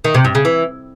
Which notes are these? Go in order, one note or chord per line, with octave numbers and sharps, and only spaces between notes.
D#3
C3
G2
C#3
E3